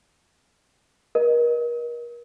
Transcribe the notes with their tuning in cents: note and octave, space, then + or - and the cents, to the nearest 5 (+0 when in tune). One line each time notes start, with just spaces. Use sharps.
A#4 +40 D#5 -10